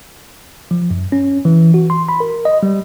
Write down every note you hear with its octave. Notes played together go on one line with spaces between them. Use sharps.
F3
F#2
C#4
E3
F#4
C6
B5
A#4
D#5
G3